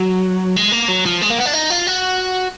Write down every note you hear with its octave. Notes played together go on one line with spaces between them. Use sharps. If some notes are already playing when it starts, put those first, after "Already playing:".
Already playing: F#3
G#3
A#3
F#3
F3
G#3
A#3
B3
D4
D#4
F4
F#4